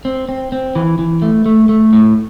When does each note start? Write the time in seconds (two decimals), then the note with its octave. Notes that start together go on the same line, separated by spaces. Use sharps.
0.05 C4
0.29 C4
0.52 C4
0.75 E3
0.99 E3
1.22 A3
1.46 A3
1.69 A3
1.93 A2